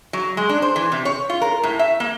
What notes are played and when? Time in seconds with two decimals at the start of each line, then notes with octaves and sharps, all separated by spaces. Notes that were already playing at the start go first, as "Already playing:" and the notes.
0.13 F#3
0.37 G#3
0.49 D4
0.62 C5
0.76 E3
0.92 C3
1.05 C#5
1.30 F4
1.42 A#4
1.63 A2
1.79 E5
2.00 A#3